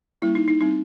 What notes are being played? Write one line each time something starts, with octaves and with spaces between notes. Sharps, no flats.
G3 A#3 C#4 E4
D#4
D#4
G3 C4 D#4